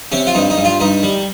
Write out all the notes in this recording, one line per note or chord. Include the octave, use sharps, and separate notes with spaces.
C3 C#4
F4
G2 D#4
D#4
G2
F4
G2 D#4
G3